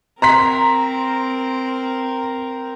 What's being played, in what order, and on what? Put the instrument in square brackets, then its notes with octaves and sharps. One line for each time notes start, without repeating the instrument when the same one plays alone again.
[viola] C4 A#4 [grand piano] A#5 C6 B6